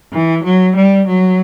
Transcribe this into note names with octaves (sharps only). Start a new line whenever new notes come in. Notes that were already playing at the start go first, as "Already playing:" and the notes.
E3
F#3
G3
F#3